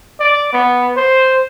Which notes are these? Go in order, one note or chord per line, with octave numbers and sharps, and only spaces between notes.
D5
B3
C5